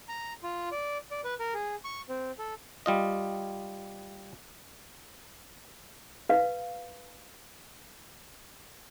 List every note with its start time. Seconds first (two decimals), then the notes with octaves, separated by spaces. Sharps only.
0.09 A#5
0.43 F4
0.72 D5
1.11 D5
1.25 B4
1.40 A#4
1.54 G#4
1.84 C#6
2.09 C4
2.39 A4
2.86 G3 F4 D#5
6.29 B4 F5